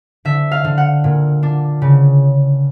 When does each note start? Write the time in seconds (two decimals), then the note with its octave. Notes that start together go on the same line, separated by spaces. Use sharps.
0.25 D3 E5
0.51 F5
0.64 D3
0.78 F#5
1.04 A#2
1.43 D4
1.82 C#3